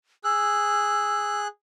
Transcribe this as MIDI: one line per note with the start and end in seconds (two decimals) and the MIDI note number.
0.24 1.47 68
0.24 1.41 88
0.24 1.47 90